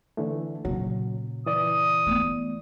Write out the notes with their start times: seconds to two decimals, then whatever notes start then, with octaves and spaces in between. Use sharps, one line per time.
0.17 D3 E3 A3
0.65 A#2 C#3 F#3
1.46 E3 D5 D#6
2.06 A3 B3